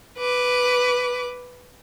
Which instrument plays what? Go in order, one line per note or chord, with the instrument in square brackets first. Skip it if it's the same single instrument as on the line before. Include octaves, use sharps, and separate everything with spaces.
[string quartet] B4 D6